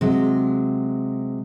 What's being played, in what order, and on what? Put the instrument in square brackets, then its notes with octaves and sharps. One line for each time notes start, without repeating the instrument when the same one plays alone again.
[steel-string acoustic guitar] C3 F#3 G#3